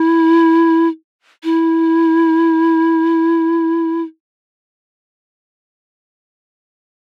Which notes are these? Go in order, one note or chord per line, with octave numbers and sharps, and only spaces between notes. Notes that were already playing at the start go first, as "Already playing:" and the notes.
Already playing: E4
E4